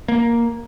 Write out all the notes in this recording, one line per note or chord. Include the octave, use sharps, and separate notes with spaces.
A#3